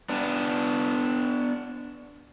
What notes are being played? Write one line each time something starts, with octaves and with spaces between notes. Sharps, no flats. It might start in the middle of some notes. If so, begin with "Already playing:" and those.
B3 D4